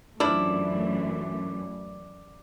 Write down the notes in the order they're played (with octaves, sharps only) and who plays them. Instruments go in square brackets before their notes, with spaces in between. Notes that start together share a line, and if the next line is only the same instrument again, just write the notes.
[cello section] F#2 E3 A3 [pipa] F3 D4 E4 [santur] D5